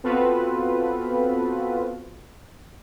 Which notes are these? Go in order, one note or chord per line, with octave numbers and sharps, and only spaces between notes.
B3 C4 F4 F#4 A4 B4